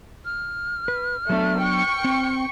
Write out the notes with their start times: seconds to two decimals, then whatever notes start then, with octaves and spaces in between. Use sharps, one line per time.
0.25 F6
0.88 B4
1.30 F#3 A3 B3 D4
1.60 G5 C#6 C#7
2.04 C4